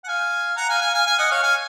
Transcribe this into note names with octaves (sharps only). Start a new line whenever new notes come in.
F#5
F5 G#5
F#5 A#5
F5 G#5
F5 G#5
F5 G#5
F5 G#5
D#5 F#5
C#5 F5
F5 G#5